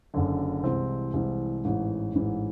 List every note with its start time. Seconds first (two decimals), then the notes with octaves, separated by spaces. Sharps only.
0.14 F#1 F#2 D3
0.63 C2 C3 E3 G#3 C4
1.13 C2 C3 E3 G#3 C4
1.64 A1 G#2 E3
2.14 A1 G#2 E3